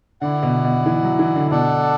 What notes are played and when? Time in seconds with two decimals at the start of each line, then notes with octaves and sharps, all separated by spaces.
0.21 D3 E4 D5 F#5
0.43 B2
0.64 B2
0.86 E3
1.03 F#3
1.19 E3
1.36 D3
1.51 B2 D4 A4 D5 F#5